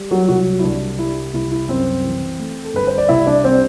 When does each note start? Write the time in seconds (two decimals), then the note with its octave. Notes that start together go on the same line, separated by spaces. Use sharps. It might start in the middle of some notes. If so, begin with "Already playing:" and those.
Already playing: G3
0.11 F#3 F#4
0.29 C2 F#3 F#4
0.59 E4
0.63 C2 D4
0.98 G3 E4
1.34 C2 E4
1.51 E4
1.69 F#2 C4 C5
2.04 E3
2.39 A3
2.65 A4
2.74 G1 B4
2.87 C5
2.98 D5
3.09 C2 E4 E5
3.27 D4 D5
3.44 G3 C4 C5